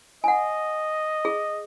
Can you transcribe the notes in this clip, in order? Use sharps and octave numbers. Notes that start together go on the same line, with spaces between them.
D#5 F#5 G#5
G#4